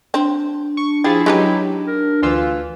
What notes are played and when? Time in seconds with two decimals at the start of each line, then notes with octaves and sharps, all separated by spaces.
0.14 C4 D4
0.77 C#6
1.04 F3 E4 G4 G#4 A6
1.26 F#3 G#3 C#4 D#4 G4 B4
1.88 A#4
2.23 D2 E3 F4 E6